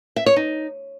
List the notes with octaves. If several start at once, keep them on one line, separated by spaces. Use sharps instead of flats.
E5
C#5
D#4